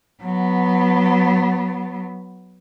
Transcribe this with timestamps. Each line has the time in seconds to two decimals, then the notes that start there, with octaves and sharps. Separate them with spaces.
0.22 F#3 B3